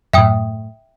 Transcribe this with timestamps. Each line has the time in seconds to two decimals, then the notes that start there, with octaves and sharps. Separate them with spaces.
0.13 F#2 A2 E5 G5 D#6